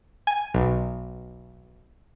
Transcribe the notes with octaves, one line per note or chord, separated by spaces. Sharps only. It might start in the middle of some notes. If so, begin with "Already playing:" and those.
G#5
B1